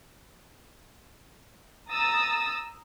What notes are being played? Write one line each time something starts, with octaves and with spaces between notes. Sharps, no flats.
A#5 D#6 E6 A6